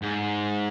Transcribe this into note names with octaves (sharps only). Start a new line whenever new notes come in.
G#2